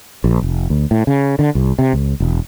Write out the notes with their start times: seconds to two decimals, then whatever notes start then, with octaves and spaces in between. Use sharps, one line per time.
0.24 A#1
0.42 F1
0.70 D2
0.91 A2
1.07 C#3
1.39 D3
1.55 C2
1.79 C3
1.93 C#2
2.20 E1